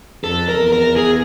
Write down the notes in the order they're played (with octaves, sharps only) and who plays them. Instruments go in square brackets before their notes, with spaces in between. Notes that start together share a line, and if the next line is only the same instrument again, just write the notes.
[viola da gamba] F2 [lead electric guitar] A4
[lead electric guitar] A#4
[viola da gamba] E2
[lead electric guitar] A#4
G#4